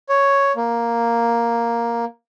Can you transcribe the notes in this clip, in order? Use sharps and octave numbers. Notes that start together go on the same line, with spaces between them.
C#5
A#3